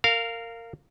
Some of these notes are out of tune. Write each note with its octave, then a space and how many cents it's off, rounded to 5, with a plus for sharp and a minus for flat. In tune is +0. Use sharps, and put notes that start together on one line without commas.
A#4 -20 F5 +0